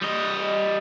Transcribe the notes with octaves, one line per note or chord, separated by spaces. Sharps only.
G3 D#5